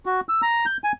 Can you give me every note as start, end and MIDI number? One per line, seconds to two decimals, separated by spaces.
0.06 0.21 66
0.29 0.41 88
0.42 0.66 82
0.66 0.77 91
0.84 0.92 80